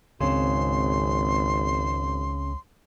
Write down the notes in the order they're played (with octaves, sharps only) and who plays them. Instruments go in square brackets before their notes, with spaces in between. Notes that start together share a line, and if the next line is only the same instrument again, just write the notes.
[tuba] G#1 [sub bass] C#2 [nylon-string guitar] C#3 C4 [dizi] C6